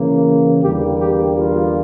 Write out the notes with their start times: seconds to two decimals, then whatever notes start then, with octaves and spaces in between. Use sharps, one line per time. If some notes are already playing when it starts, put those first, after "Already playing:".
Already playing: C#3 E3 A#3
0.61 E2 D3 G3 A#3 G4
0.98 G4
1.36 F4